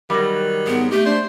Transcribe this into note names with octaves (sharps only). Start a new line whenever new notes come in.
D#3 F#3 G3
G#2 B3
A3 G4
D4 C5